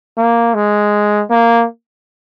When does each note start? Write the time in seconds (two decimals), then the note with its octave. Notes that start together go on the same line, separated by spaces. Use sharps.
0.18 A#3
0.54 G#3
1.30 A#3